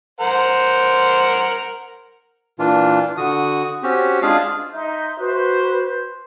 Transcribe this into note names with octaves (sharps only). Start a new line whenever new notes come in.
A#4 C5 F#5
A#2 E3 D4 F4
D3 F#4 D#6
C4 C#4 F#4 G4
G#3 D4 F4 G#4 F5
D#4 E5 C6 G6
F#4 B4 C5 F#6